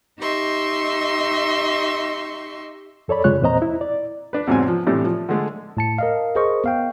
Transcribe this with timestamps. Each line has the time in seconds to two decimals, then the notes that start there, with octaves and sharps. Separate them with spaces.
0.20 D#4 G4 D#5 E5 C6 C#6
3.08 F2 A4 C#5 D5 B5
3.24 F#2 C#3 G#3 F4 C#5 F#6
3.41 E2 A#2 C4 C5 D#5 A#5
3.62 E4
3.81 D5
4.33 D4 B4
4.47 E2 G#2 C3 F#3 C4 G#5
4.68 F3
4.86 A2 C3 E3 G3 D4
5.05 F3
5.29 D3 G#3 A3
5.77 A2 A5 C#7
5.98 A#4 D#5 F5
6.36 G#4 A#4 C5 D#5 C#6
6.64 B3 F5 G5